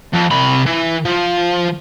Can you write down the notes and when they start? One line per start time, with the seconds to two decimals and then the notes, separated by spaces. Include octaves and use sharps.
0.13 F2
0.31 C3 B5
0.66 E3
1.05 F3